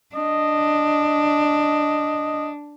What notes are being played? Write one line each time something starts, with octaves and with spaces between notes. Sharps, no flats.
D4 D#5